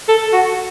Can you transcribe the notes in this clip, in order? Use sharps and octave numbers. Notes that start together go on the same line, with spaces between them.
A4
F#4